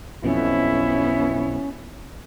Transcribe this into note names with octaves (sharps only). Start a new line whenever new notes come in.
B1 F2 B2 B3 C#4 E4